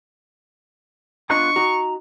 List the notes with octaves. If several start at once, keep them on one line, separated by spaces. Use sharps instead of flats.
B3 D4 F4 D#5 A#5 C#6 F#6
D#4 F#4 A#5